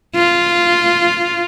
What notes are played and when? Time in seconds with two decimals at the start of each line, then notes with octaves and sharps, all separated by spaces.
0.16 F4